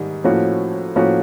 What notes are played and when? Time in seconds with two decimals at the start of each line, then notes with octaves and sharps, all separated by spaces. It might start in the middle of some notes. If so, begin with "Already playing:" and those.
Already playing: G#2 D#3 G3 D#4
0.24 A2 F3 A#3 C#4 F#4
0.96 A2 F3 A#3 C#4 F#4